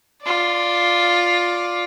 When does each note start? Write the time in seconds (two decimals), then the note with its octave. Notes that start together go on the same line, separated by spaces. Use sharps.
0.23 F4 D5